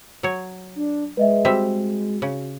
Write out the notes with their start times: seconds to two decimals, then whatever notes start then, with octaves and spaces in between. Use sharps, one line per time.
0.23 F#3 C#5
0.76 D4
1.17 G#3 B4 D#5 E5
1.45 G3 C4 F#4 E5
2.22 C#3